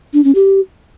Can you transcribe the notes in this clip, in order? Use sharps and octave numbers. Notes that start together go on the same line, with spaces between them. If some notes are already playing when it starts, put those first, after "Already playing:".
D4
C#4
G4